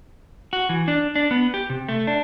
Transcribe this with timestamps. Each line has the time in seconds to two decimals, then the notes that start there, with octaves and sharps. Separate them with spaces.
0.53 F#4
0.69 E3
0.88 D4
1.16 D4
1.31 B3
1.54 G4
1.70 C3
1.89 A3
2.07 D4